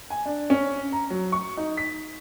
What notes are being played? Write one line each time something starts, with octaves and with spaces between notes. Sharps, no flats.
G#5
D4
C#4
A#5
F#3
C#6
D#4
B6